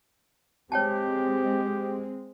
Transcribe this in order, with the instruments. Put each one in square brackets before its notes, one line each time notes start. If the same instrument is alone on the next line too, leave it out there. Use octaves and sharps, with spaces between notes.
[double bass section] G#3 C4 [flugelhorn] G4 [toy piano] C#5 G5 A5